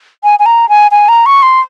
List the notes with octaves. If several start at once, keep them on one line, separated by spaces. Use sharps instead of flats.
G#5
G#5
A#5
G#5
G#5
A#5
C#6
C6